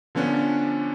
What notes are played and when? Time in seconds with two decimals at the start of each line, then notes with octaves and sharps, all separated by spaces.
0.15 D3 F3 B3 C#4 D4